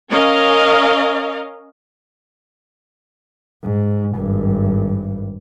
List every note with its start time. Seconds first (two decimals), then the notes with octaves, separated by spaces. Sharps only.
0.10 C#4 A#4 D#5 F5
3.63 G#2
4.16 G#1 G2